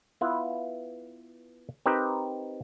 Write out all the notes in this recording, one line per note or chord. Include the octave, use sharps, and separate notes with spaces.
B3 E4 F4 B4
C4 D#4 G4 A#4 B4